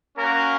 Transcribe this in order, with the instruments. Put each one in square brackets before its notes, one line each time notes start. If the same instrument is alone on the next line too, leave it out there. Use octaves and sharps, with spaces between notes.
[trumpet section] A#3 C#4 F#4 A#4